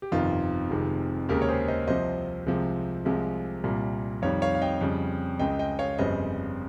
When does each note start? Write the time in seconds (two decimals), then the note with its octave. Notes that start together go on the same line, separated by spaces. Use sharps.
0.02 G4
0.12 G1 F2 C3 D#3 F4
0.70 F1 F2 C3 D#3 G#3
1.29 D#2 C#3 G#3 G4 A#4
1.42 C#5
1.49 G#4 C5
1.68 C5 D#5
1.87 C2 C3 F3 C5 D#5
2.46 C2 C3 F3 G#3
3.05 C2 C3 F3 G#3
3.64 C2 A#2 G3
4.22 F2 D#3 G3 C#5 F5
4.42 C#5 F5
4.55 F5
4.62 D#5 G5
4.81 F2 C#3 G3
5.39 C#2 C#3 G#3 D#5 G5
5.59 D#5 G5
5.79 C#5 F5
5.98 G1 F2 C#3 G3 C5 D#5